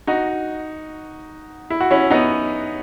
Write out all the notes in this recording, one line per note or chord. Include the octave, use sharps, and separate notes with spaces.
D#4 F#4
E4
F#4
C#4 E4
B3 D#4